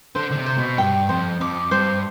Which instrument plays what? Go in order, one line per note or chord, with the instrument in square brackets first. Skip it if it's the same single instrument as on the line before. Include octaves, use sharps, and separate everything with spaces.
[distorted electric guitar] D3 [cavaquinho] C5
[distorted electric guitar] D3
C3
[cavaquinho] C5
[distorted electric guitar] B2
[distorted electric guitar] G2 [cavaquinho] G5
[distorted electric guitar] F2 [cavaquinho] C5
[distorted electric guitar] F2 [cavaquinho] D6
[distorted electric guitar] G2 [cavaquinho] C5